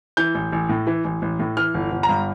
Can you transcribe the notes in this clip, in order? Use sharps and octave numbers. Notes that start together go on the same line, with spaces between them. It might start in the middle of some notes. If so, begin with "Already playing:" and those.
E3 G6
A1
A1
A2
E3
A1
A1
A2
E3 F6
G1
G1
A#5
G2